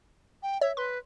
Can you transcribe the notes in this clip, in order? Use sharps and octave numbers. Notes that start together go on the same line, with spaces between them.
G5
C#5 E5
B4 C6